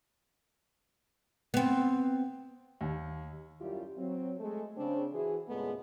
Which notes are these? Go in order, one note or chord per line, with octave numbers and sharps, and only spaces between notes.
B3 C4
D#2
F#2 G3 E4 F4 G4
F#3 C4
G#3 A3 A4
C#3 C4 D4
E3 E4 F#4 G#4
E2 A#2 C#3 G#3 A3 B3